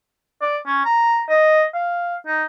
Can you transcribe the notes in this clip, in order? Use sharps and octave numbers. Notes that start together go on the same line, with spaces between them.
D5
C#4
A#5
D#5
F5
D#4